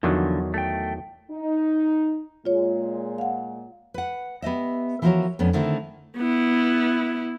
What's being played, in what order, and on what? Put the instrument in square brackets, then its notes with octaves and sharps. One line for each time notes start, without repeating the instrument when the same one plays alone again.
[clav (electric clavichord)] E2 D#3 F#3 [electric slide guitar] D3 F3
[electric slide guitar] A3 G5
[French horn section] D#4
[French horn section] A#2 G#3 [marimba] F4 C#5
[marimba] F5 F#5
[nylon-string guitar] B4 F#5
B3 G4 D#5 E5
E3 F3 E4 F#4 A#4 C#5
F2 B3 C#4 D4
D3 D#3 A3 C4 E4
[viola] B3 E4